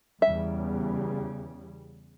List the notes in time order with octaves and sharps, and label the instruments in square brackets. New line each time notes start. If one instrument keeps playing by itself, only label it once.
[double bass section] E2 C#3 G3 [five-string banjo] E5